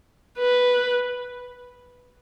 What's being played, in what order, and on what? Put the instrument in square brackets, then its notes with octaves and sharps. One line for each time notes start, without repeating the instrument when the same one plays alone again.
[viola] B4